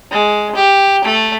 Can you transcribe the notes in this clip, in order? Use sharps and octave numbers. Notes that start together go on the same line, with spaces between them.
G#3
G4
A3